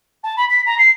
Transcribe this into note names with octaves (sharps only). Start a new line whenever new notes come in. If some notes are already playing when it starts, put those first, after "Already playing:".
A5
B5
B6
A#5
C7